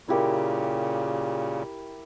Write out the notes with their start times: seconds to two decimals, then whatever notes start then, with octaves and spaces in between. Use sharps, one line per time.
0.08 A#2 C#3 E4 G4 A#4